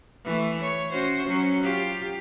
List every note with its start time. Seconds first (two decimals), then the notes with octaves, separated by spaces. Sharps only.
0.25 E3 A3
0.61 C#5
0.92 C#4 F#4 C5
1.26 F#3 C#4
1.62 F4 G4